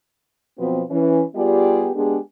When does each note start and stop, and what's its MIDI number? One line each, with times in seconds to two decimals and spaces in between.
0.58 0.82 47
0.58 0.82 53
0.58 0.82 54
0.58 0.82 59
0.58 0.82 60
0.91 1.22 52
0.91 1.22 61
1.36 1.90 55
1.36 1.90 59
1.36 1.90 65
1.36 1.90 67
1.36 1.90 68
1.36 1.90 74
1.95 2.17 56
1.95 2.17 59
1.95 2.17 62
1.95 2.17 67
1.95 2.17 68